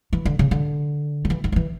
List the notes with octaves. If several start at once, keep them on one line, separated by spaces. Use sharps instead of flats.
E3
D3
C#3
D3
F3
E3
D#3
F3
E3